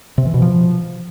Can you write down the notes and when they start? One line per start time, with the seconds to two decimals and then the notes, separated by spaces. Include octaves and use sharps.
0.18 C3
0.26 E3
0.34 B2
0.42 F3